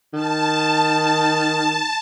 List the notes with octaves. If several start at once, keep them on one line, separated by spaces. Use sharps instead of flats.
D#3 A5